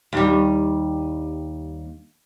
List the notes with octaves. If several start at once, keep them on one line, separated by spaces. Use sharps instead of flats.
D#2 G3